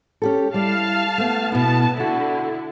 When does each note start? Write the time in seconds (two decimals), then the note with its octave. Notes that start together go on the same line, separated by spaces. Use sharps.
0.22 C#4 G4 A4
0.54 G3 E4 F5 A5
1.18 A3 B3
1.52 B2 B3 E4 A5
1.97 D3 D4 E4 F#4